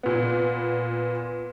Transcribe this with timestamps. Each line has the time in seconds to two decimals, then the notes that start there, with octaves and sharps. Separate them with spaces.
0.03 A#2 B3